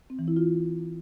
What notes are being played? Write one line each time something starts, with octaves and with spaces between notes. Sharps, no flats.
C4
E3
E4
F4